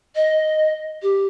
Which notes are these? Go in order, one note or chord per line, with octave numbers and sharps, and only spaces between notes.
D#5
G4